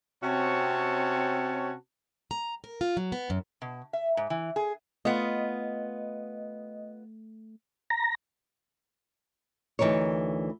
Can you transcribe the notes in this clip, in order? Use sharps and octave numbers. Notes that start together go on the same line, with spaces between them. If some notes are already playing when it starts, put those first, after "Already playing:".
C3 C4 C#4 F#4 C#5 A5
A#5
A#4
F4
F#3
B3
F#2
B2
E5
G#2
E3
G#4
A3 B3 F4 D#5
A#5
D2 E3 D#4 A#4 C#5